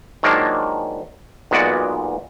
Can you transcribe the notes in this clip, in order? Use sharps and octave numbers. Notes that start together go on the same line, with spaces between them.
D#3 F3 F#3 G#3 A#3 D4
B1 A#2 G#3 B3 F#4 D5